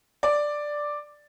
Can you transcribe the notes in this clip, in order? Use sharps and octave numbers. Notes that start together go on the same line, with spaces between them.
D5